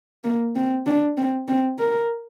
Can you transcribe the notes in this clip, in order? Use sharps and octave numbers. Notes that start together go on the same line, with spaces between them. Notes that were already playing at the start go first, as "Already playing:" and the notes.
A#3
C4
D4
C4
C4
A#4